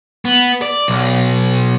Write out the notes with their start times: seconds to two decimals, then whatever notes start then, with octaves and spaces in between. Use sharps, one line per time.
0.25 B3
0.62 D5
0.88 B1